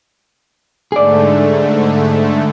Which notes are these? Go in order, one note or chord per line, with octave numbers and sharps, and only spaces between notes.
G#2 D3 A3 G#4 D5